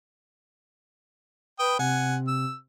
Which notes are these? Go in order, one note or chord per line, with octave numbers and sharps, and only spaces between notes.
B4 G5 D#6
C3 F#5 G#5
E6